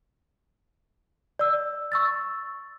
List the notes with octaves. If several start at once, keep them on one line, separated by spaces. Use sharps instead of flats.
D5 E6
C#6 E6 A6